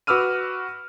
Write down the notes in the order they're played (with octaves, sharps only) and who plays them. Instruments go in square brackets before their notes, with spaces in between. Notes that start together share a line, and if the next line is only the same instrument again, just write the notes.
[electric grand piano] F#4 B4 D6 E6 F6 D#7